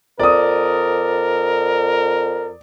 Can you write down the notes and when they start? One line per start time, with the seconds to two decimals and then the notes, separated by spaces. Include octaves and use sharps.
0.20 F2 A#4 D5 D#6